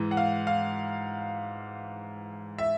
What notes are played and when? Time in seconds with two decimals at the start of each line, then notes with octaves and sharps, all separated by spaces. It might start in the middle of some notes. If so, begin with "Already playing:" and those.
Already playing: G#2 E3
0.11 F#5
0.17 F5
0.47 F5
2.58 E5